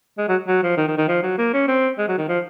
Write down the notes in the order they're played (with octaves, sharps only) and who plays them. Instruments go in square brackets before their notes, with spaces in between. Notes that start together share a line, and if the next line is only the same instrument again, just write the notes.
[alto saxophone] G#3
F#3
F#3
F3
D#3
D#3
D#3
F3
F#3
A#3
C#4
C4
G#3
F#3
D#3
F3